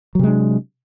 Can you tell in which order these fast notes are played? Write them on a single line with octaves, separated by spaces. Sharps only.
F#3 C3 G#3 D4